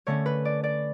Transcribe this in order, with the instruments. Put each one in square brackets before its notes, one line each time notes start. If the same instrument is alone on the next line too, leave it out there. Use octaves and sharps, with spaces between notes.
[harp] D3 A3 C#4 C#5
B4
D5
D5